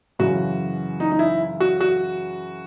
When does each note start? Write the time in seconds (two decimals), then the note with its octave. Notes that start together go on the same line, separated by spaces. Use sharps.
0.19 F#2 C#3 E3 F#4
1.00 D#4
1.12 D#4
1.19 E4
1.60 F#4
1.81 F#4